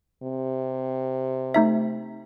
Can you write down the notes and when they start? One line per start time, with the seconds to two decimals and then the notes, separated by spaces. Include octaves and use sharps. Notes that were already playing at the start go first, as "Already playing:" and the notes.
0.23 C3
1.54 A3 D#4 E5